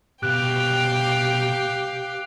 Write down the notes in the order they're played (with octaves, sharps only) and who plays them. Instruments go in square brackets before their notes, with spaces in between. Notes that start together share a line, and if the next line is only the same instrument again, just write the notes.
[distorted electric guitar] C2 B2 [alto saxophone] G4 [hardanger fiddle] F5 G5 [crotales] F#6